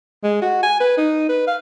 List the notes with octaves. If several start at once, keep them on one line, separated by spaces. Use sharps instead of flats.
G#3
F#4
G#5
B4
D#4
B4
F5